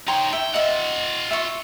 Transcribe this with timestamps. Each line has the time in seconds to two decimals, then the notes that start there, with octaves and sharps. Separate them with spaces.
0.08 D#4 C#5 G5 A#5 C6
0.33 E5 G5
0.54 F4 D#5 E5 F#5
1.31 E5 C#6